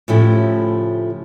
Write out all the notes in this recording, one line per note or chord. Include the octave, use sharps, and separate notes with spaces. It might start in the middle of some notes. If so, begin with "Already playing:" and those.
A2 C#3 F3 A3 E4 G4